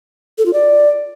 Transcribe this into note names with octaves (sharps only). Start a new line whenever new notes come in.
A4
F4
D5